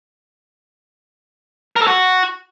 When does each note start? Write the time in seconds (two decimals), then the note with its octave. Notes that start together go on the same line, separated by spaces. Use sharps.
1.76 A#4
1.82 A4
1.87 F#4